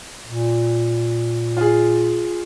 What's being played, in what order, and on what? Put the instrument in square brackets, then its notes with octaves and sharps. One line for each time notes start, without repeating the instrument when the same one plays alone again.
[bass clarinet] A#2
[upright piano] F4 G#4